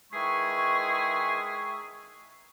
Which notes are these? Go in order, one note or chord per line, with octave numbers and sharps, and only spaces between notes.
D#3 E3 G#3 E4 G#4 C#6